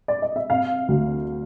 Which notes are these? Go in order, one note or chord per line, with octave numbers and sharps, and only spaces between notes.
D5
D#5
E5
C3 F5
D2